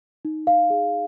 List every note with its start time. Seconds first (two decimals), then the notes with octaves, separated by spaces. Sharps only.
0.25 D#4
0.47 F5
0.70 G#4